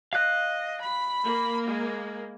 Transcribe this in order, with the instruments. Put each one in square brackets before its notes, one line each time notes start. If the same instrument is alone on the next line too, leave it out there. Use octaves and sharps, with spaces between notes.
[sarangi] D#5 [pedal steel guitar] F5 F#6
[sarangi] B5
[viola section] A#3
[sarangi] G#3